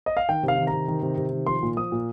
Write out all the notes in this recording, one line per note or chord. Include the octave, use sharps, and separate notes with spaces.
D#5
F5
D#3 G5
C3
F5
D#3
A#5
C3
D#3
C3
C3
D#3
F3 C6
A#2
F3 D#6
A#2